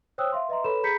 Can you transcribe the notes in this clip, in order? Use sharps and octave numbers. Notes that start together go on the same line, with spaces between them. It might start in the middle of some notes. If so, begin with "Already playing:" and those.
C5 C#5 G5 D#6 E6 F#6
E5 F5 C6
B4 D#5 E5 A#5 C6
A4 B4 C#5 B5 E7
G#4 A#5 B5 G6 B6 C#7